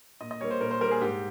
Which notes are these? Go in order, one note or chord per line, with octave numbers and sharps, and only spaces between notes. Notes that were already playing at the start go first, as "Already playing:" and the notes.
A#2 D#5
D#5
G3 A#3 C#5
C5
A#2 A#4
C5
G3 A#3 A#4
G#4
G#2 G4